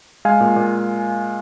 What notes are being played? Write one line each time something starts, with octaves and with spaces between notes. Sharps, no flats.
G#3 F5 G#5
A#2
A#2